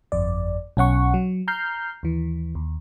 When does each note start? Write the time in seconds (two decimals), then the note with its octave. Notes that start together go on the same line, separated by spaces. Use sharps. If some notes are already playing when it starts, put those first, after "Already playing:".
0.12 G1 F2 D5
0.77 B1 C#4 F#5 C#6
1.14 F#3
1.48 A#5 F6 G6 C7
2.03 D#2 E3
2.55 D#2